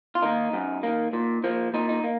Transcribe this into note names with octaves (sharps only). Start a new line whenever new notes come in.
F4
D#3 A#3 D#4
F#2
D#3 A#3
A#2
F3 A#3
A#2 D#4
D#4
A#3